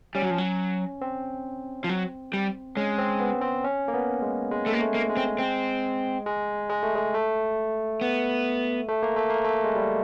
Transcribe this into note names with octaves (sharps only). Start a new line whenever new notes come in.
G3 C#4
F#3
F3
F#3
C4
F3
F#3
G3
G#3 C#4
C4
B3
C4
C#4
A#3
B3
G#3
G#3
A3
A#3
A3
A#3
G#3
C4
C4
G#3
G#3
A3
G#3
A3
B3
A3
A#3
A3
A#3
A3
G#3
G3